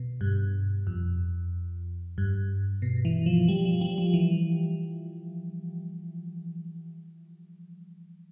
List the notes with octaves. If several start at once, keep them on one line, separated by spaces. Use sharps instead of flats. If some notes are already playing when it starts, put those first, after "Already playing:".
Already playing: B2
G2
F2
G2
B2
E3
F3
G3
F3
G3
F3
E3